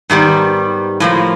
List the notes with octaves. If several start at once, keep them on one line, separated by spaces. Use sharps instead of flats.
G#2 D#3 G3 B3
A2 F3 A#3